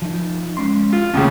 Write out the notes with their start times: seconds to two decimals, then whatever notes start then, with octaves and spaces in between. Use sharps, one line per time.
0.02 F3 D#4
0.57 G#3 C#4 C6
0.93 F4
1.14 D#2 A2 C#3 C#4